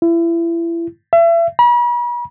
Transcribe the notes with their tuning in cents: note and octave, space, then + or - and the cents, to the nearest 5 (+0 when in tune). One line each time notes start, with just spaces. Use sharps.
E4 +30
E5 +35
B5 -45